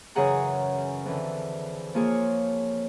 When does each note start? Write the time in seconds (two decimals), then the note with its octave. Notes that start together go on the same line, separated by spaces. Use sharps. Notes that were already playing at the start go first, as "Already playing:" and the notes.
0.15 F#2 C#3 E3 G#4 F#5 A#5
1.05 F2 D3 E3
1.94 F3 A#3 F4 G#4 C#5